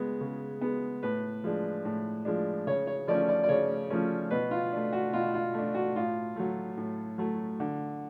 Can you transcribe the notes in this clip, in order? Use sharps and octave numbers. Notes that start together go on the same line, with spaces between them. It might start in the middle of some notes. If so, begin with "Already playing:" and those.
Already playing: C#3 G#3 B3
C#3
G#3 B3
A2 B4
F3 G#3 D4
A2
F3 G#3 D4
C#3 C#5
C#5
F3 A3 C#4 D5
D5
D5
C#3 C#5
F3 A3 C#4
B2 B4
F4
A3 D4
F#4
B2 F4
F4
A3 D4
F#4
A2 F4
F#3 A3
A2
F#3 A3
D3